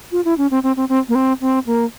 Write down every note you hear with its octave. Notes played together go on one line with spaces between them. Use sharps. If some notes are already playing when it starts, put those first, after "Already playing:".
F4
E4
C#4
C4
C4
C4
C4
A#3
C4
C4
A#3